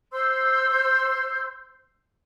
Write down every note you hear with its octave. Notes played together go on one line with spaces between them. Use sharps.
C5 C6 E6 G6